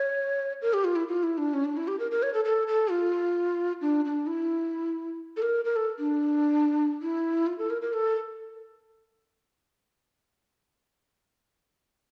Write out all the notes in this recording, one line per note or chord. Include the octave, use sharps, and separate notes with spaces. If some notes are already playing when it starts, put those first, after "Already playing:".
Already playing: C#5
A#4
G4
F4
E4
F4
E4
D4
C#4
D4
E4
G4
A#4
A#4
C#5
A4
A4
A4
F4
D4
D4
E4
A4
A#4
A#4
A4
D4
E4
F4
A4
A#4
A#4
A4